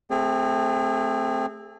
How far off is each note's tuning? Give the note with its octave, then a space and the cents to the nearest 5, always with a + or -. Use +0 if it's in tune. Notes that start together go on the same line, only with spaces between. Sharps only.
A3 +0 C4 +0 G#4 -35